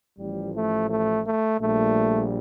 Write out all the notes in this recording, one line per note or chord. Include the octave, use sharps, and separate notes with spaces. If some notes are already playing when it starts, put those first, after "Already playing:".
A1 A2 F3 G3
A3
A3
A3
A#1 A#2 G3 A3